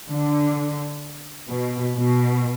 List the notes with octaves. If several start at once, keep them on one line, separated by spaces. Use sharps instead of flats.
D3
B2
B2